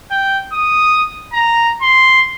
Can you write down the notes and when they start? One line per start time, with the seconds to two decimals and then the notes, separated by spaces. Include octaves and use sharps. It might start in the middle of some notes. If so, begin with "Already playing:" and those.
0.11 G5
0.53 D#6
1.33 A#5
1.82 C6